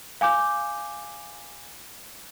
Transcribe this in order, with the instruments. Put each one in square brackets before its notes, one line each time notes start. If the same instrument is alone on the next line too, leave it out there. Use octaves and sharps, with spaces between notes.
[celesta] F5 G#5 D6 G6